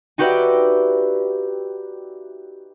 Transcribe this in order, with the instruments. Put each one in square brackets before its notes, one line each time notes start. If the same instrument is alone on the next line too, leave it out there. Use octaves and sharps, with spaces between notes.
[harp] D#4 F#4 G4 B4 D5 E5